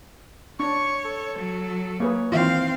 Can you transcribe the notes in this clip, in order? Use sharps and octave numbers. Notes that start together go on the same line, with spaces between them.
D4 C#5 C#6
A4
F#3
A#3 G#4 B4 C#5
D#3 E3 C4 F4 F5